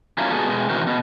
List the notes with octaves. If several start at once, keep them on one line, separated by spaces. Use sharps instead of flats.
F#3 A3 A#3 C#4 E4 F4
G#3 B3 F#4 G#4 A4
B2 G#3
D#3 E3 C4 F#4 A#4 C5
B2